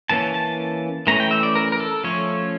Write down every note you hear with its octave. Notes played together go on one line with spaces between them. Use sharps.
E3 A#3 C#4 A5
A5
E3 A3 C#4 A#5
G5
E5
D5
A#4
A#4
A4
F3 A3 C#4 C#5